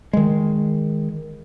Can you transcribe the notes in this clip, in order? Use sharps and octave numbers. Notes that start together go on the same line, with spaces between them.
D#3 G#3